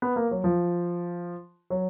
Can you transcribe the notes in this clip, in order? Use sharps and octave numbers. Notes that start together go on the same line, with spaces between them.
B3
A#3
F#3
F3
F#3